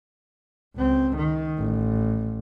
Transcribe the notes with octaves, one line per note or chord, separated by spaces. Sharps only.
C#2 C4
D#3
A1